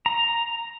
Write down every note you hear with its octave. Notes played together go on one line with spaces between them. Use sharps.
A#5